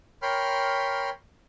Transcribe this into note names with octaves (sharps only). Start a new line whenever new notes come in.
A#4 C#5 G5 B5 C6 F6